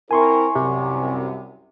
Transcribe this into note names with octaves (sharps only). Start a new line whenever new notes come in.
C4 E4 A#4 G#5 C6 C#6
C2 F#2 C3